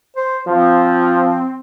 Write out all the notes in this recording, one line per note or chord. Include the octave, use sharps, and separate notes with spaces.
C5
F3 C4